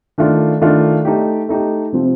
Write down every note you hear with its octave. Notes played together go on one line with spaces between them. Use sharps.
D#3 A3 D4 F4
D#3 A3 D4 F4
A3 D#4 G4
A3 D#4 G4
C3 F3 C4